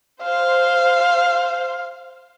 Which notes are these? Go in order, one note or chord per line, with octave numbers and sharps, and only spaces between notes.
C5 F5